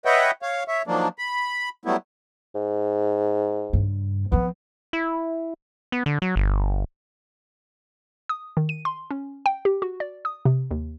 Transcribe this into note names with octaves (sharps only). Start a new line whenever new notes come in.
B4 C#5 D#5 E5 F#5 G5
C#5 F5
C#5 E5
D#3 F3 F#3 A#3 D4
B5
F#3 G3 A3 B3 E4
G#2
G2 C#3
F3 B3 C4
E4
B3
D3
F#3
G1
D#6
D#3
D#7
C6
C#4
G5
G4
F#4
D5
D#6
C3
D#2